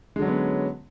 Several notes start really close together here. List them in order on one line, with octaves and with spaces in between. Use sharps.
G#3 D3 F#3 C#4 B3